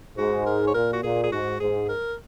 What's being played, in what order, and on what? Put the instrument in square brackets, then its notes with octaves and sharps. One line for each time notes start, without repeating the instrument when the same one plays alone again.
[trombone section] G#2 [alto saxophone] F#4
[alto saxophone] A#4
C#5
[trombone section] A#2 [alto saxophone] A#4
[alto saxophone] F#4
[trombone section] A#2 [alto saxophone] G#4
[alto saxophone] G#4
[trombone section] G#2 [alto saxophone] F#4
[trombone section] G#2 [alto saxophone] G#4
[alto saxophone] A#4